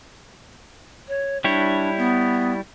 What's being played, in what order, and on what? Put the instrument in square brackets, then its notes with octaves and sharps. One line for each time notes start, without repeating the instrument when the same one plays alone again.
[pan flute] C#5
[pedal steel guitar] G3 E4 C#5 [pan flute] D4
[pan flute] B3